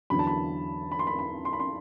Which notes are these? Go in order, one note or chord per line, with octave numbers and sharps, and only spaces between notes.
E2 D3 F#3 B5
A5
B5
B5
C6
B5
B5
C6
B5
C6